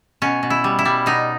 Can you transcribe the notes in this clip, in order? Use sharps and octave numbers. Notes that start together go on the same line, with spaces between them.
B2 C#4
B2
E4
G3
E4
G3
B2 D#4